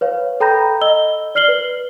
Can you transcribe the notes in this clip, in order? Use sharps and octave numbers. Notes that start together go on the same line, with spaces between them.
B4 C#5 F5
A4 G5 A#5 B5 G6 A#6
D#5 E6 G7
D5 F6 C7 F#7 G7
B4